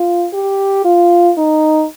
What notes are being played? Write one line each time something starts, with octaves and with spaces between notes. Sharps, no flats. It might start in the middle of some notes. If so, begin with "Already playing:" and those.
Already playing: F4
G4
F4
D#4